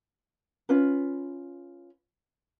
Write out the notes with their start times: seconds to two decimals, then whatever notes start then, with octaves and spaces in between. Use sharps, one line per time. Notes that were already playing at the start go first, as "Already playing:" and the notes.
0.69 C#4 F4 B4